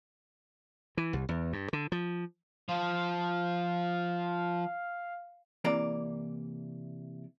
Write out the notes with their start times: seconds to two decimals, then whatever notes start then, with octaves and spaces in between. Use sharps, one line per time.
0.97 E3
1.13 C2
1.29 E2
1.53 G2
1.73 D3
1.92 F3
2.69 F3 C5 F5
5.64 C3 E3 A#3 D5 A#5